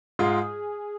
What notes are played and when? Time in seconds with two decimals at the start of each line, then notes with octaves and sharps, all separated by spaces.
0.19 G#2 G#3 F4 G#4